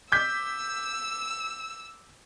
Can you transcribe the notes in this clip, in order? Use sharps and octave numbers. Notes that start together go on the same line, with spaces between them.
D6 E6 G6 B6